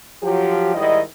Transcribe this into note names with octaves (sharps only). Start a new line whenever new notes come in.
F3 F#3 G4
G#2 D#3 G3 E4 D#5